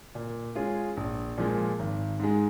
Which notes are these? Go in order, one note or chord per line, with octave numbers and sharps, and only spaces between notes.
A#2
G#3 C#4 F4 G#4
A#1
A#2 F3 G#3
G#1
G#2 G#3